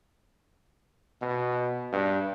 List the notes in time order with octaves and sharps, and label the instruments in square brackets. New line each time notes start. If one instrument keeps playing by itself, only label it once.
[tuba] B2
G2